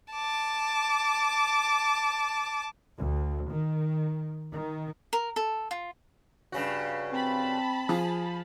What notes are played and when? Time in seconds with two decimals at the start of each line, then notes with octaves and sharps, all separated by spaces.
0.14 A5 D6
2.97 D2
3.51 D#3
4.52 D#3
5.13 A#4
5.36 A4
5.71 F4
6.52 G2 C#3 F#4
7.13 C4 A5 B5
7.89 F3 G#4